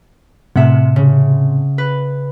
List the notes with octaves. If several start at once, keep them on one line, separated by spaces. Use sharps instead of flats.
A2 C3 E5 F#5
C#3
B4